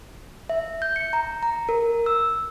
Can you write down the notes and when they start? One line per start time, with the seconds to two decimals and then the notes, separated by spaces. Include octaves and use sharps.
0.50 E5
0.82 G6
0.96 C#7
1.13 A#5
1.43 A#5
1.69 A#4
2.06 E6